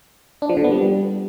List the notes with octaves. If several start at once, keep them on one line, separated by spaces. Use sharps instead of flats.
D4
F3
D3
B3
G3